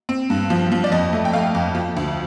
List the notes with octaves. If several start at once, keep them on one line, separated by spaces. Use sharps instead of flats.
C4
G2
F3
F3
D5
F2 D#5
A3
G5
A3 F5
F2
F3
D2